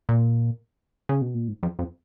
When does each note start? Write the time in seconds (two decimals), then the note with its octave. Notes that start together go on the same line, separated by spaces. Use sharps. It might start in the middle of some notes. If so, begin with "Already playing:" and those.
0.09 A#2
1.09 C#3
1.22 B2
1.34 A#2
1.48 G#2
1.63 F2
1.79 F2